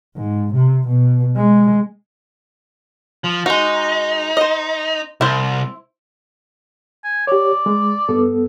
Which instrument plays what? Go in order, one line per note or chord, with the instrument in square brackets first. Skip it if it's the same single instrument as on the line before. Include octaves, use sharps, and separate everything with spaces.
[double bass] G#2
C3
B2
G#3
[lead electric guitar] F3
[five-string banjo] G#3 F#4 [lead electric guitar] D#4
[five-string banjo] C5 D#5
[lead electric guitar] C2 [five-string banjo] E4 C5
[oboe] G#5
[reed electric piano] G4 C#5 [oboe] D5
[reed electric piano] G#3
G2 B3 A4